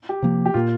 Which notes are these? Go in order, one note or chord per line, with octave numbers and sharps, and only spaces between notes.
G4
C3 F3 A#3
G4
A#2 A#3 F4